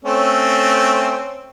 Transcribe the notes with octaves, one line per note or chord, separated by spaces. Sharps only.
A3 C4 C#4